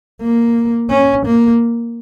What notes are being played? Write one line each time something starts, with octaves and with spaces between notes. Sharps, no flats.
A#3
C#4
A#3